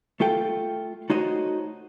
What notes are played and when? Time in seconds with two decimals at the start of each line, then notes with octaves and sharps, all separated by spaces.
0.20 A3 F4 A4 G5
1.10 A3 D#4 F#4 C5 C#5 D#5